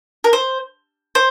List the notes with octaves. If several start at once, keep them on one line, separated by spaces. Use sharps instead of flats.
A#4
C5
C5